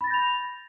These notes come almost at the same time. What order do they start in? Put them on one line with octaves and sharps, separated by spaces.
B5 A6 A#6 G6 F7